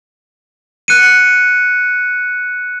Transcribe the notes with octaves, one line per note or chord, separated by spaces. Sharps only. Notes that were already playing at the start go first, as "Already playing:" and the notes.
F#6 C#7 D#7